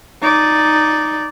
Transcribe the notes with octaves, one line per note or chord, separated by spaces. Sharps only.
D#4 D5